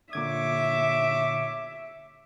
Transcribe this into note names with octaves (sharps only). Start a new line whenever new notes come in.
A#2 D3 C#5 E5 D6 G#6